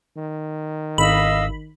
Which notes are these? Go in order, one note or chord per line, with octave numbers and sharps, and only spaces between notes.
D#3
G#1 D#5 F5 B5 E6